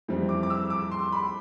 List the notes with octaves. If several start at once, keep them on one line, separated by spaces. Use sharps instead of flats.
F2 E3 G3 C4
D6
D6
E6
D6
C6
B5